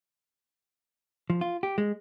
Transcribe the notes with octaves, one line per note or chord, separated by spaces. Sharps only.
F3
F4
G4
G#3